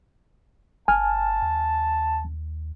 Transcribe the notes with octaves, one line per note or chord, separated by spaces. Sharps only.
G1 G#5 A5 F6
D#2